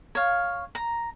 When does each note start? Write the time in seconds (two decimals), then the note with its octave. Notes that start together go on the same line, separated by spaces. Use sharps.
0.15 C#5 F5
0.75 A#5